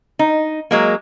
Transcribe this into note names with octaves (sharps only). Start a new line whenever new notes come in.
D#4
F#3 G#3 A#3